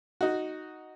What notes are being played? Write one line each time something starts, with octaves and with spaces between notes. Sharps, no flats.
D#4 F#4